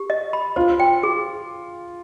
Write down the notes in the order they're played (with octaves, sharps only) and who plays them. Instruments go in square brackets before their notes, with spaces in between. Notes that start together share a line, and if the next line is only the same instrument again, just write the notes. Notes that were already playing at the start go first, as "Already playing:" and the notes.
Already playing: [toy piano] G4
D#5
B5
[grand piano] F4 [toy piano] C5
[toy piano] G5
G#4